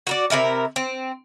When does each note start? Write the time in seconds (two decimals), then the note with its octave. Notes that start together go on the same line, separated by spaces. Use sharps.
0.07 F#4 A#4 D5
0.30 C3 D#3 E4 A#4
0.76 C4